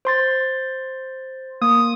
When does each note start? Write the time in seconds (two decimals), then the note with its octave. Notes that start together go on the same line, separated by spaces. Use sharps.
0.05 C5 C6 A6
1.62 A#3 D#6